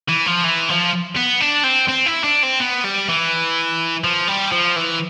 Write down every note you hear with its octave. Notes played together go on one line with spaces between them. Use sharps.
E3
F3
E3
F3
B3
D4
C4
C4
E4
D4
C4
B3
G3
E3
F3
G3
F3
E3